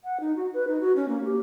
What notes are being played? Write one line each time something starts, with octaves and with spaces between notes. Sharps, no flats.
F#5
D#4
F#4
B4
D#4
F#4
C#4
A#3
G4